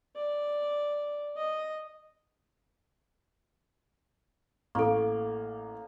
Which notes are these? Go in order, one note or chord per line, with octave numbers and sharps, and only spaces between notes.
D5
D#5
A1 A#3 A4 C#6